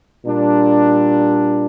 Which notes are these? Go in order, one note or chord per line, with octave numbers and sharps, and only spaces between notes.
A#2 G3 D4